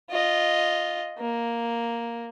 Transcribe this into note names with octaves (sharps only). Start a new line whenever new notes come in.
F4 D#5
A#3